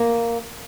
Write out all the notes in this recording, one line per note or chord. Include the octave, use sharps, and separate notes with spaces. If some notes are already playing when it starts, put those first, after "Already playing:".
Already playing: A#3